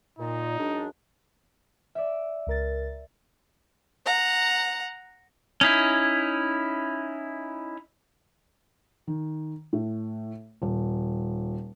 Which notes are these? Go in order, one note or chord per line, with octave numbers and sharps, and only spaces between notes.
A#2 D#4
F#2 G#3 D4
D5 E5
C#2 A#4 A6
F#5 A#5
C#4 D#4 E4
D#3
A2
D#1